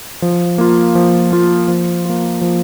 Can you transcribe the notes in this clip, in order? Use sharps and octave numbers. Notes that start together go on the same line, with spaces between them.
F3
A#3 F4
F3
A#3 F4
F3
A#3 F4
F3